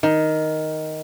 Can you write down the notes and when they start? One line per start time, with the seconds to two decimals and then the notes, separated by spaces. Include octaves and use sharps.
0.03 D#3